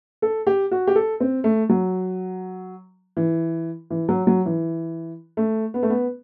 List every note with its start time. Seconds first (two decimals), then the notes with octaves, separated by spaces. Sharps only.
0.22 A4
0.47 G4
0.71 F#4
0.87 G4
0.95 A4
1.20 C4
1.44 A3
1.69 F#3
3.17 E3
3.90 E3
4.09 F#3
4.27 F#3
4.46 E3
5.37 A3
5.74 B3
5.83 A3
5.90 B3